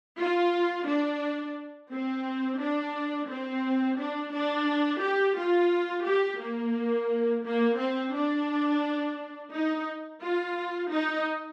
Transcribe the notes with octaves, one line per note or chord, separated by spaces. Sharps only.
F4
D4
C4
D4
C4
D4
D4
G4
F4
G4
A#3
A#3
C4
D4
D#4
F4
D#4